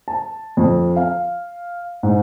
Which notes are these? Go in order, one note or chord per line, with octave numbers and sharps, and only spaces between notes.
A5
F2
F5
G#2